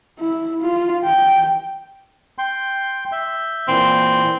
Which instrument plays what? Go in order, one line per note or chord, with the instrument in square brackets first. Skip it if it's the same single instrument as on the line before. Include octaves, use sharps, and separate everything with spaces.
[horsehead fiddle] E4
F4
G5
[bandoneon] G5 C6
E5 G6
[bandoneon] A#2 E3 [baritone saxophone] C4